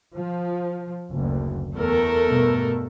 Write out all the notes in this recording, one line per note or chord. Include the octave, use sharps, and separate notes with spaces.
F3
F#1 D2
E2 A3 A4 A#4
G2 B2